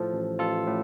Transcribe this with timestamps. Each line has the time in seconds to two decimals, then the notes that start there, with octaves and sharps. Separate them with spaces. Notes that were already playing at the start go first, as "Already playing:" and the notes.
Already playing: A2 F3 A4 C5
0.13 A1
0.39 A1 F4 A4
0.67 A2